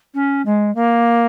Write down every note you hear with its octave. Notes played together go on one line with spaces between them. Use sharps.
C#4
G#3
A#3